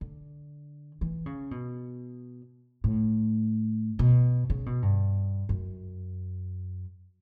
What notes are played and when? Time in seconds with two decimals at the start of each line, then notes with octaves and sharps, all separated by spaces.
0.01 D3
1.01 E3
1.26 C#3
1.51 B2
2.84 A2
3.99 B2
4.50 C#3
4.66 B2
4.82 G2
5.49 F#2